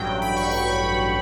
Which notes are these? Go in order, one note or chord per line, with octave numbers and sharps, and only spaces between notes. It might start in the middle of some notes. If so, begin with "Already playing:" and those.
Already playing: A1 G2 F#3 G5
B5
C#6
B5